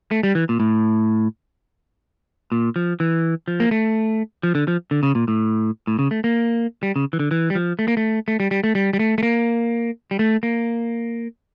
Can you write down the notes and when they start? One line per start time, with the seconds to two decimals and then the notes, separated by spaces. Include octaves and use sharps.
0.11 A3
0.23 G3
0.35 E3
0.49 A#2
0.60 A2
2.52 A#2
2.76 F3
3.00 E3
3.48 F3
3.60 A#3
3.71 A3
4.43 F3
4.55 D3
4.68 F3
4.91 D3
5.03 C#3
5.15 A#2
5.28 A2
5.87 A2
5.99 C#3
6.11 A3
6.24 A#3
6.83 G3
6.96 C#3
7.13 E3
7.19 D3
7.31 E3
7.50 G3
7.55 F3
7.79 A3
7.88 A#3
7.97 A3
8.28 A3
8.40 G3
8.51 G3
8.64 A3
8.75 G3
8.93 G3
8.99 A3
9.18 A3
9.23 A#3
10.11 G3
10.19 A3
10.43 A#3